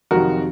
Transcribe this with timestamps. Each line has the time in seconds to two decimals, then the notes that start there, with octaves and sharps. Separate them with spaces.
0.11 F2 C3 D#3 F#3 F#4 A#4